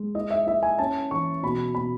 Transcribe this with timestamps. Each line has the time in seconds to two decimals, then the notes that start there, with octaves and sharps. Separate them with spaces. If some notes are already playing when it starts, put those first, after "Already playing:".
Already playing: G#3
0.15 E4 D#5
0.31 E5
0.47 E4 E5
0.63 G#5
0.79 C#4 A5
1.11 E3 C#6
1.43 B2 B5
1.75 B2 B5